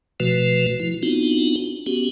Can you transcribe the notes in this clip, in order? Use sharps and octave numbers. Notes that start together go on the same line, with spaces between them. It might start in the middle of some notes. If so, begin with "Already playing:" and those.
B2 F3 A3 F#4 B4
F3 E4
B3 C4 D4 D#4 F4 F#4
B3 C#4 F#4 G4